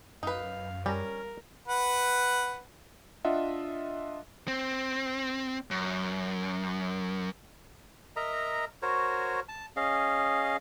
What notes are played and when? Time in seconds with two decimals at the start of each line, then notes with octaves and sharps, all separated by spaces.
0.23 F#2 D#4 B4 F5
0.86 G3 C#4 A#4 A#5
1.68 B4 F#5
3.24 D4 F4 D#5 E5 F#5
4.48 C4
5.71 F#2
8.16 A#4 D#5 E5 A#5
8.82 F#4 A#4 C5 C#5
9.48 A5
9.76 C#4 G#4 D#5 F5